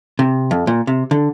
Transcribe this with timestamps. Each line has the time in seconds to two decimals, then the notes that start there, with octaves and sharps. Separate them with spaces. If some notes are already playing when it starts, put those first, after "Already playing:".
0.19 C3
0.51 F2
0.67 A#2
0.87 C3
1.11 D3